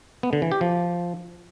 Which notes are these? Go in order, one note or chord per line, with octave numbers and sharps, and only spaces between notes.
B3
D3
E3
G4
F3